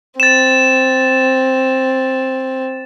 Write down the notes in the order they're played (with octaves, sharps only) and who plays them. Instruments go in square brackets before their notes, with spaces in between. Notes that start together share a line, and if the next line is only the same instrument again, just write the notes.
[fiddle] C4 [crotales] A6 E7